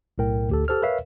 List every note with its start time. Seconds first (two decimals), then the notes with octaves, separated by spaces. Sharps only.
0.18 B1 A2 A#4 G5
0.49 D2 G4 A4
0.68 G4 A4 C5 F6
0.82 A#4 B4 C#5 E5 F5